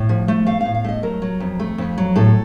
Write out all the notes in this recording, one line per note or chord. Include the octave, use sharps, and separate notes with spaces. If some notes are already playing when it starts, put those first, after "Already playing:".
Already playing: A2
F3
A3
A3 F5
A2 F5
F5
A3 D#5
F#3 A#4
F#3
F2
A3
F2
F#3
A2 A4